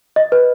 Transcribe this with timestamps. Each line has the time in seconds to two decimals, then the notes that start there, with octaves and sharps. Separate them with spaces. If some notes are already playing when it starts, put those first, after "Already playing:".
0.16 D#5
0.32 B4